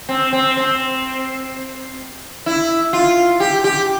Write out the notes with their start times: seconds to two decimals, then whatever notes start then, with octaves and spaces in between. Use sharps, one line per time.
0.09 C4
0.33 C4
0.57 C4
2.46 E4
2.93 F4
3.40 G4
3.64 G4